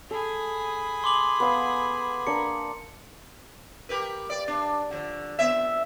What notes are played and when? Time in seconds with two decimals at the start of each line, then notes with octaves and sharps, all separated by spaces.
0.11 G#4 A4 B5
1.04 C6 D6 F#7
1.40 B3 F5
2.27 A#3 D4 C#7
3.89 G4 A#4 B4
4.30 D5
4.48 D4
4.91 D3 F3
5.39 F2 B3 E5